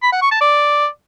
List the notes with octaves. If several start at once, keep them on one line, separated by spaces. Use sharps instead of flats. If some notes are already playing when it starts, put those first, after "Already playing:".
B5
F#5
C#6
A5
D5